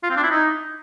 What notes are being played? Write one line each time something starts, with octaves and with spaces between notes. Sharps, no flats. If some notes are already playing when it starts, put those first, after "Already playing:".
F4
C4
D4
E4
D#4